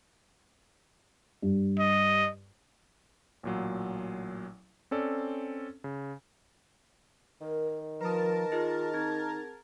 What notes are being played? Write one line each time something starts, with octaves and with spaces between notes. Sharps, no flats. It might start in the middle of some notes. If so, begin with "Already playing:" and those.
G2
D#5
A1 A#2 F#3
C4 C#4 A4 D5
C#3
D#3 A#4
F3 A#4 B4 A5 D#6
D#4 F4 G#4 D#5
C4 D#4 G#4 G#6